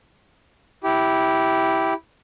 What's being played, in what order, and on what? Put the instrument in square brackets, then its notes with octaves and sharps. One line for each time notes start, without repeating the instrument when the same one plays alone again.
[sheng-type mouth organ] E4 G4